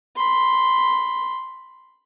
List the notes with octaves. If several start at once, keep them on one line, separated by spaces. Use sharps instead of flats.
B5 C6